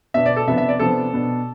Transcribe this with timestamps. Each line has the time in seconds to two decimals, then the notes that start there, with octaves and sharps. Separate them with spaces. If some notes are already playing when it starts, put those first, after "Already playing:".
0.14 B2 B3 D4 E5
0.26 D5
0.36 A4
0.47 C3 F3 B3 D4 E5
0.58 E5
0.69 D5
0.79 C3 F3 B3 D4 A4
1.13 B2 B3 D4